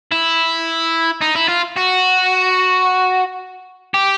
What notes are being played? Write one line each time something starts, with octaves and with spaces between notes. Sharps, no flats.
E4
D#4
E4
F4
F#4
G4